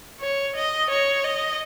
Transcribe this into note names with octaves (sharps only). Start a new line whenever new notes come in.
C#5
D#5
C#5
D#5